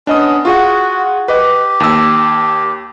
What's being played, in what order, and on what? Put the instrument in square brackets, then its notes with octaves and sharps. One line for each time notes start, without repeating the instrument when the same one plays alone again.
[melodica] B3 C#4 [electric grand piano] D4 D#5 D#6
[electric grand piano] F4 G#4 F#5 [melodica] F#4
[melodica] G4 [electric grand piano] B4 D#5
[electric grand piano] D#2 E6